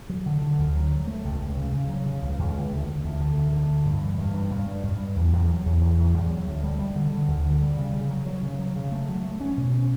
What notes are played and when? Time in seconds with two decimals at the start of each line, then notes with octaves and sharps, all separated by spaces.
0.10 F#3
0.26 D3
0.42 D3
0.58 D2
0.76 F#3
0.92 F#3
1.07 A3
1.25 C#2
1.41 C#2
1.57 C#3
1.72 C#3
1.89 F#3
2.06 C#3
2.22 C#2
2.39 C#2
2.55 D2
2.71 D2
2.87 D2
3.04 D2
3.21 D3
3.37 D2
3.52 D3
3.69 D2
3.85 G2
4.02 E3
4.18 G2
4.34 G2
4.51 G2
4.67 G3
4.83 G2
5.00 G2
5.16 E2
5.33 E2
5.48 F#3
5.66 E2
5.81 E2
5.98 E2
6.14 E2
6.30 F#3
6.47 D2
6.64 G3
6.79 G3
6.96 D3
7.12 D3
7.28 D2
7.45 D3
7.62 G3
7.77 C#3
7.93 C#3
8.09 F#3
8.26 F#3
8.43 C#3
8.59 F#3
8.76 C#3
8.92 A3
9.09 F#3
9.24 A3
9.41 C#4
9.57 B2
9.74 C#4